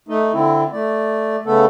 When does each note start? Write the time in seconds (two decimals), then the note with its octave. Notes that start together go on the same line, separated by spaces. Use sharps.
0.09 A3 D#4
0.33 D3 C4 E4
0.72 A3 D5
1.46 C#3 A3 B3 A4